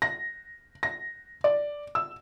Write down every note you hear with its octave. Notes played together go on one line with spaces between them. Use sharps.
A#6
A#6
D5
E6